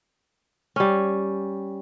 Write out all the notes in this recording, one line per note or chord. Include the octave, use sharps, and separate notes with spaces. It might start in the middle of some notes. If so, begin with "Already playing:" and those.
G3 C#4